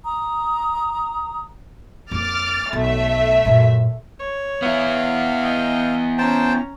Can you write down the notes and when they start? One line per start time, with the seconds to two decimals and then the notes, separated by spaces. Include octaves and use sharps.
0.04 A#5 D#6
2.11 F2 A#3 D6 F6 A6
2.73 B1 A3 E5
3.45 F#2 A#2
4.19 C#5
4.62 B3 E4 F5
5.43 D#5 G5
6.18 C#4 C5 G5 A5 A#5